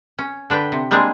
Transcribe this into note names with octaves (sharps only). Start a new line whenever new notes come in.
C#4
D3 D4 B4 G5
C3
G3 G#3 A#3 C4 D4 G#4